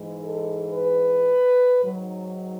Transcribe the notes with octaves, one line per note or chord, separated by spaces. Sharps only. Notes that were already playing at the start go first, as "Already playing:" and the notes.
Already playing: G#2 E3 G#3
A4
B4
G#2 D#3 F#3